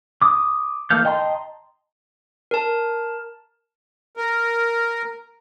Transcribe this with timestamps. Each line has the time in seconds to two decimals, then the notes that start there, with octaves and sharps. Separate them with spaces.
0.22 D6 D#6
0.90 E3 A#3 A4 F5 G6
1.05 D#5 G5 A5 A#5 C6
2.51 A#4 A5
4.17 A#4